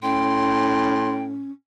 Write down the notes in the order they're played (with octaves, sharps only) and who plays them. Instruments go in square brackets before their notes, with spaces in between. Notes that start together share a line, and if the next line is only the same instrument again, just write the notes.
[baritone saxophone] A2 [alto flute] C#4 [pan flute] G5 [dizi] C6